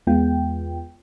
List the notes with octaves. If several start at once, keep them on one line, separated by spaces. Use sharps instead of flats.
E2 G#3 B3 F4 G5